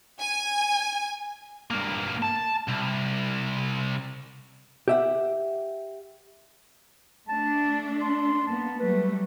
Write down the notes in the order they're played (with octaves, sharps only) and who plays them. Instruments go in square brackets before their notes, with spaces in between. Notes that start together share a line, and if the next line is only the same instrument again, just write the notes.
[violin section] G#5
[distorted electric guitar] G2 A#3
A5
C2
[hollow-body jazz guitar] G4 E5 F#5
[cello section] A3 D4 [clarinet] A5
[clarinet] C6
[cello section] A#3 B3 [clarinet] A5
[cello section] F#3 G3 A3 [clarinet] B4